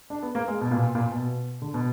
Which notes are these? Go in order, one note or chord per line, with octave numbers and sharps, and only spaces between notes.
D4
B3
A#3
G#3
B2
A#2
A#2
B2
D3
B2